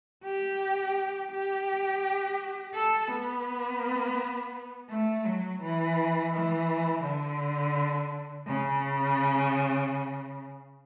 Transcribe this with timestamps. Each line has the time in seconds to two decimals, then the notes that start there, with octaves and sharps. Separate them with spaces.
0.25 G4
1.31 G4
2.74 A4
3.11 B3
4.90 A3
5.25 F#3
5.62 E3
6.33 E3
7.04 D3
8.47 C#3